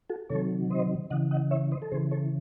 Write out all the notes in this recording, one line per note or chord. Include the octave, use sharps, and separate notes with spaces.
F#4 A4
C3 D#3 F#3 A4 C#5
C5 D#5
C#3 E3 D#5 F#5
D#5 F#5
C#5 E5
C5 D#5
A4
C#3 E3 G#4 C5
A4 C#5